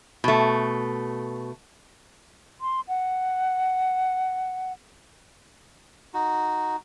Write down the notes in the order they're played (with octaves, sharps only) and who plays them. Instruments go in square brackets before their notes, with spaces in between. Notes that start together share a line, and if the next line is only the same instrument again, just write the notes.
[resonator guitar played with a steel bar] B2 A3
[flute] C6
F#5
[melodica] D#4 F#4